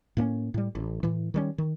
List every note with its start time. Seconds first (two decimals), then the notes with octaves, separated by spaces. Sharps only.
0.17 A2 A#3 C4 C#4
0.54 A2 G3
0.75 A1
1.03 A2 E3
1.34 D#3 G3 C#4
1.58 D#3